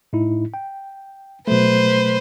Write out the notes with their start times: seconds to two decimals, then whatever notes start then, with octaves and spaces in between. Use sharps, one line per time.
0.13 A2 D#4 E4
0.54 G5
1.48 B2 F#3 A3 B4 C5